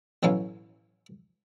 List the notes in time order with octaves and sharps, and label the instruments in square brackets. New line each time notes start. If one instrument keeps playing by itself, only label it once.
[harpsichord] A1 B2 F#3 C#4 E4 F5